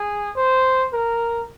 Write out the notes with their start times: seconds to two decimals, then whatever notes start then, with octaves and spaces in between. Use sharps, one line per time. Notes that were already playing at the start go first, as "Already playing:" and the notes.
Already playing: G#4
0.36 C5
0.93 A#4